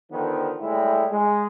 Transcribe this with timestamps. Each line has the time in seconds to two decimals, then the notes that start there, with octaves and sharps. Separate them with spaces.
0.11 D3 D#3 F3 B3
0.61 A2 G3 G#3 E4
1.11 G#3